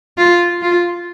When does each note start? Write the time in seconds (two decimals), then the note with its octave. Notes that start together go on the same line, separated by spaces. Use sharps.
0.17 F4
0.62 F4